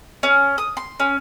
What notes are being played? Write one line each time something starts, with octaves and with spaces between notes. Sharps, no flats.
C#4
D#6
C6
C#4